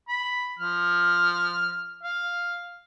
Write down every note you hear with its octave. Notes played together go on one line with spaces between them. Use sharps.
B5
F3 F6
F5